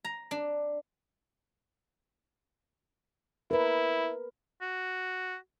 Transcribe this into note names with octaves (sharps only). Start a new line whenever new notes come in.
A#5
D4
E4 A#4 B4
F#4